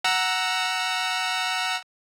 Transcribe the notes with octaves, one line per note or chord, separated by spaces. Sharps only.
F#5 A#5 E6